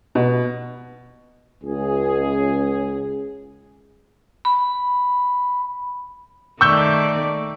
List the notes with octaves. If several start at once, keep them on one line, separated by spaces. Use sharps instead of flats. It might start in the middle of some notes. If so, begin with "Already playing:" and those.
B2
C#2 G#4
B5
D#3 A3 D5 C#6 E6 G6